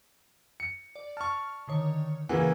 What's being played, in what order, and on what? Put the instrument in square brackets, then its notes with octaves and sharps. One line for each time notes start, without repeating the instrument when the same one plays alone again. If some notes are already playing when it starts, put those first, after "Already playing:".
[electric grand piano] C#7
[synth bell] D5
[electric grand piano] A5 C#6 [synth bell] F6
[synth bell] D3 D#3 C#5
[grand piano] C#3 E3 [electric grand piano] A#3 [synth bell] F#5